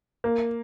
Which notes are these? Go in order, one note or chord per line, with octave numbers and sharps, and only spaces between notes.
A#3